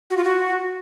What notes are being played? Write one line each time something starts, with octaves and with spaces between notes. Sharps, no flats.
F#4
F4
F#4